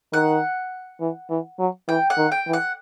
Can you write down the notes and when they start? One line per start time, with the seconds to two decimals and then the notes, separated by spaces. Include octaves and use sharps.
0.13 D#3 F#5
1.00 E3
1.30 E3
1.59 F#3
1.88 E3 G5
2.10 F#5
2.17 D#3
2.32 G5
2.47 E3
2.53 F#5